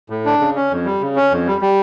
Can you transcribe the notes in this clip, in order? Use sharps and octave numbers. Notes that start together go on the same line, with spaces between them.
A2
D4
C#3
C#4
F2
G3
C#3
C#4
F2
G3
G3